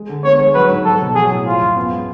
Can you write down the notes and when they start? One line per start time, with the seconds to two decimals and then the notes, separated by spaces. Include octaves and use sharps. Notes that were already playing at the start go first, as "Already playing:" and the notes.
Already playing: G#3
0.09 D3
0.24 B3 C#5
0.39 G#3
0.55 F#3 B4
0.70 G#2
0.85 F#3 A4
1.01 B2
1.15 F#3 G#4
1.31 A2
1.46 F3 F4
1.61 F#2
1.76 B3
1.91 G#3